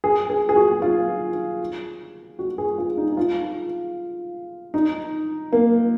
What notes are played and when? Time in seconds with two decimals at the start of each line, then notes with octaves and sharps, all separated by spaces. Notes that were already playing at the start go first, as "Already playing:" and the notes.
0.04 G#4
0.30 G#4
0.49 G#4
0.56 F#4
0.82 F4
2.39 F#4
2.58 G#4
2.78 F4
2.97 D#4
3.12 D#4
3.17 F4
4.74 D#4
5.52 A#3